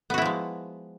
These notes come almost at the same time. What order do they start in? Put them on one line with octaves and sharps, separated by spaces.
B3 F#4 E4 F3 G#3